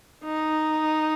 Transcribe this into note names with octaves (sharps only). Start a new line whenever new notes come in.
D#4